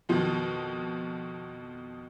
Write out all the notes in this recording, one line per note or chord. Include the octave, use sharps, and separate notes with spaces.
F2 B2 D#3